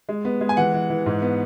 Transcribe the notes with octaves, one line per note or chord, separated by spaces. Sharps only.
G#3
B3
G#3
G#5
E3 F#5
E3
E3
G#2
B3